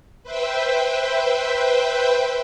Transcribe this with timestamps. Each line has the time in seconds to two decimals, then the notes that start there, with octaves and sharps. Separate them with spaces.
0.23 B4 C5 E5 G5